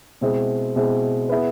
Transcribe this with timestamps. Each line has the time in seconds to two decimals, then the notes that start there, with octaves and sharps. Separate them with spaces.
0.21 B2 G#3 C4 E4 G#4
0.76 B2 G#3 C4 E4 G#4
1.29 B3 E4 G#4 B4